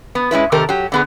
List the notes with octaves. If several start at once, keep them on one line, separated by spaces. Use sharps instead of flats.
B3
G#3 C#4 E4 B4
C3 D#3 G4 A4 A#4
F#3 G4
D3 B3 G#4